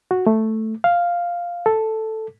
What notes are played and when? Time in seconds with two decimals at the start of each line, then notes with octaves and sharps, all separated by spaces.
0.11 F#4
0.27 A3
0.84 F5
1.66 A4